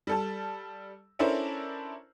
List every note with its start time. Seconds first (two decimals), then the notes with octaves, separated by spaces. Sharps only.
0.07 G3 A4 A5
1.19 C#4 D4 E4 A4 A#4 C5